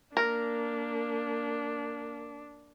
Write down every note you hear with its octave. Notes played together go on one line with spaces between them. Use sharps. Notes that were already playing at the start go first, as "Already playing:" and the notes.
A#3 D4 A#4